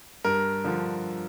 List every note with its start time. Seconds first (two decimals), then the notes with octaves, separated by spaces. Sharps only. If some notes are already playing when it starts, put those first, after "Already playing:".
0.24 G2 A#4
0.65 D3 F3